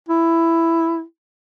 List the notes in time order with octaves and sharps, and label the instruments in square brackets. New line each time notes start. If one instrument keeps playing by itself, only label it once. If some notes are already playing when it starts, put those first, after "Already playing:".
[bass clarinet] E4